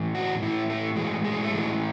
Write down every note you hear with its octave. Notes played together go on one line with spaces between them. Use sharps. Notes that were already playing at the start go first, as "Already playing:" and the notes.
Already playing: A2 E3
F#4
A2 E3 E4
A3
A2 E3 G#3
G#3
A3
A2 E3 G#3